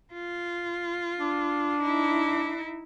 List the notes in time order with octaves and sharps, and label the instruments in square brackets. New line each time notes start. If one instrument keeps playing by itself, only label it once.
[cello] F4
[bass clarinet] D4
[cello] D#4 E4